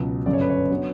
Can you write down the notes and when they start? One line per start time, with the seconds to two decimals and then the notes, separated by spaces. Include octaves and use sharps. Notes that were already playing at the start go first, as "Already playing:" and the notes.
Already playing: C#2 B2 F#3
0.26 G1 F#2 C#3 D5
0.33 C#5
0.41 B4
0.50 C#5
0.70 D3 F#3 B3